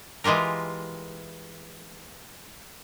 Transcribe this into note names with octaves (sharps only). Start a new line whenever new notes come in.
E3 G#3 F4 G4 A#4